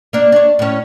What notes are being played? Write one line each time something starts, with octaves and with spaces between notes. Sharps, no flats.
A#3 D4
D4 C#5
A2 C#4